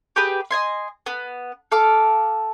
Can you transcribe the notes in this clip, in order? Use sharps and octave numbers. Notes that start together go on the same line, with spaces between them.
G4 G#4 B4
D#5 G#5 C6
B3
A4 F5 D6